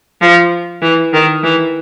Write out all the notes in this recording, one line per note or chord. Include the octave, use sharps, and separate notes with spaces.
F3
E3
D#3
E3